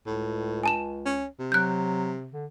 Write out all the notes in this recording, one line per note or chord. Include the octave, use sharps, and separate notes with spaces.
C#2 A2
G#5 A5 E7
C#4
C3
F#3 F#6 G6
D3